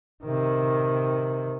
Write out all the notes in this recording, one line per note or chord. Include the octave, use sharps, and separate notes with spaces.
C3 D#3